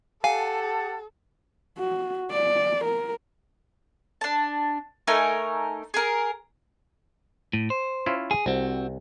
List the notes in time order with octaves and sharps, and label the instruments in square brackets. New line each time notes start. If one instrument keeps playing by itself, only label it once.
[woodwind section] G4 F#5 A5 [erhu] A4 [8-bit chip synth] F5 G#5
[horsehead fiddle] F#4
D5
A#4
[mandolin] D4 A5
A3 D#4 A#4 G#5
G#4 A#4
[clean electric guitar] A2
C5
[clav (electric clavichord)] C#4 E4 F4
[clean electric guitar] G#4
[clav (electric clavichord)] C2 [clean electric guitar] C4 F#4